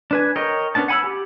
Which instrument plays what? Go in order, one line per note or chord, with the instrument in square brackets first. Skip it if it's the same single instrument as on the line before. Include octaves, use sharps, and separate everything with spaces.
[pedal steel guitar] D4 B4 G#5
A#4 C#5 D#5 G5
B3 C#4 D4 A5
F#5 G#5 B5 D6 E6
G4